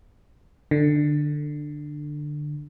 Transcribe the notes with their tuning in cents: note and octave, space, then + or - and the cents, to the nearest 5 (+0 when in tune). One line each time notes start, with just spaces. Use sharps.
D3 +15